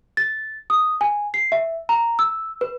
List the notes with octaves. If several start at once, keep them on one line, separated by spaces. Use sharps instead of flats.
A6
D#6
G#5
C7
E5
A#5
E6
B4